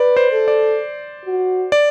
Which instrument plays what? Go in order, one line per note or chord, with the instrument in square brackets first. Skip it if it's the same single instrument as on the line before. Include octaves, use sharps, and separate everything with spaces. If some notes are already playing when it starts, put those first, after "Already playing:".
Already playing: [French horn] B4 [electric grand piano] D5
[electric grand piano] C5
[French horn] A4
[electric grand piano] D5
[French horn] F#4
[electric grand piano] D5